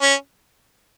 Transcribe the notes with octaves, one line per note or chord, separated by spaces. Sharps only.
C#4